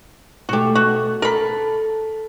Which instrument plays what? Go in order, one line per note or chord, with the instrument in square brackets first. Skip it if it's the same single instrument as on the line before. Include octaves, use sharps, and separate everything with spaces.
[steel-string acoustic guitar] B2 A3 [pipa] F#4 G4
[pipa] F#4
[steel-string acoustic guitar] A4 [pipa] A#4 B5